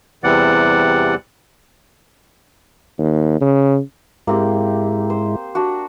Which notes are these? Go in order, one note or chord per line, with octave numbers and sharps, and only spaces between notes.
E2 C3 E3 G3 D5 F#5
D#2
C#3
G#2 G#3 A#3 C4 E4 G4
C5
D4 F#4